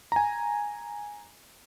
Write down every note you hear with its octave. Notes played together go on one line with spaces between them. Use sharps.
G#5 A#5